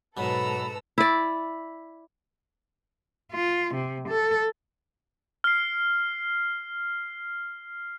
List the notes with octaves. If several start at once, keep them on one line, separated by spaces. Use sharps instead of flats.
G#2 B2 F#3 A4 B4 A#5 B5 E6
E4 D5
F4
C3
A4
F6 C7